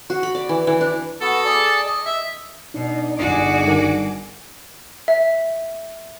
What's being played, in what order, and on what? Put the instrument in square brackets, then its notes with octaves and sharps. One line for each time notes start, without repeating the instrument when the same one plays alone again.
[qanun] F#4
B5
D5
E3
E3
D4
[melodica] B3 F#4 [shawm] A4
[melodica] G#4 D5 A5
D#5
[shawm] E5
[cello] B2 [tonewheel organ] D4 D#4
[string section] G1 G#4 D6 [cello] F#4
[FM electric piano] G2 D#3 D4
[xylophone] E5